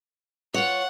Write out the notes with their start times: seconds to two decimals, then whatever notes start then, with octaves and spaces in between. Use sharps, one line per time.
0.54 F4 C#5 F#5